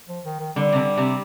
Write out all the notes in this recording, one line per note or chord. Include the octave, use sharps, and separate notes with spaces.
F3
D#3
D#3
D3 G3
C3
D3
C3